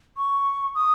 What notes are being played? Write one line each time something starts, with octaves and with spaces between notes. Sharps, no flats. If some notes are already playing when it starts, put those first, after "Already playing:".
C#6
D#6